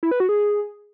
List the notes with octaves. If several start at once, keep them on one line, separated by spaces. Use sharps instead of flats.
E4
B4
F#4
G#4